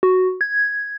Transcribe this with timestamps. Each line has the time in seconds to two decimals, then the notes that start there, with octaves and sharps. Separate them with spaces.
0.03 F#4
0.41 G#6